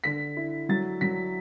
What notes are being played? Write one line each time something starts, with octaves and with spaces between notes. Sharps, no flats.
D3 B6
E4
F#3 A6
F#3 B6